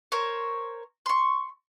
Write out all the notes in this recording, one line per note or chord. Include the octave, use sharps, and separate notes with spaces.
A#4 C5 C#5
C6 C#6